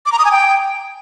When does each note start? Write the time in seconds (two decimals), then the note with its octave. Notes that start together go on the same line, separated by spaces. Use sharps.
0.06 D6
0.12 A#5
0.19 D#6
0.25 G#5
0.31 G5